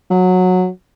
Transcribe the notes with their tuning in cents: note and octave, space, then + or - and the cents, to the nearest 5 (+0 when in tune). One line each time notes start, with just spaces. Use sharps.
F#3 -15